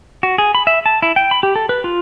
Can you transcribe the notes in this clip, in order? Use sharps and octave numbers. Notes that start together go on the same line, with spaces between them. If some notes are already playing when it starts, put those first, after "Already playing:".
F#4
G#4
B5
E5
A5
E4
G5
B5
G4
A4
B4
F4